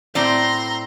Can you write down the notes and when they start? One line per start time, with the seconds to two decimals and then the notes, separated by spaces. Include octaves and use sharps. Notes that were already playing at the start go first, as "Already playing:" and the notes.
0.15 A2 C4 D5 A#5 C6